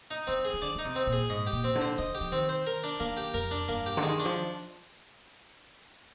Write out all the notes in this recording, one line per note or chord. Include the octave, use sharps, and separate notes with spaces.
D#4
D#3 C4
G#4
D#3
D3 D5
D3 D#4
C3
C4
A#2
G#4
G#2 D#5
G4
A#2
C4
D3
C5
D3 D#5
G4
F3
D#3 C4
C5
A#4
D4
D#3 A#3
G4
F2 A#4
D4
G2 A#3
G4
D3
D#3 G#3
D4
F3